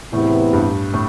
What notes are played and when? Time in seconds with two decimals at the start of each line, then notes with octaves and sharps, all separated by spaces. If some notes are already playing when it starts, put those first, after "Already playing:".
0.12 E2 A2 C3 E3 B3 E4
0.53 G2
0.94 A2